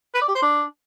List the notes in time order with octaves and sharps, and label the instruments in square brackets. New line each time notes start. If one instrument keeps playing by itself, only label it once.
[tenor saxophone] B4
D5
G4
C5
D4